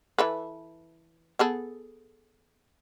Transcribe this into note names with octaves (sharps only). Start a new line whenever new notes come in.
E3 A4 B4
B3 G#4 A4